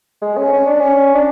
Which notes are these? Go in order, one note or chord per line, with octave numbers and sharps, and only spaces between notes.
G#3
C#4
C#4
D4
C#4
D4